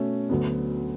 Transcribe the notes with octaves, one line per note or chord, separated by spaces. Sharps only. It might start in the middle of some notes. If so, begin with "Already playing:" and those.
Already playing: B2 A3 C#4
D2 D3 F#3 B3